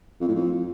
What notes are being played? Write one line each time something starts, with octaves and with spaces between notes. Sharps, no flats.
F2
A2
F2